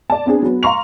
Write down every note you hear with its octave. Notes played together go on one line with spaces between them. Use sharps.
D5 A5
B3 C4 D4 G#4
F#3 B3
F5 A#5 C6 C#6 F7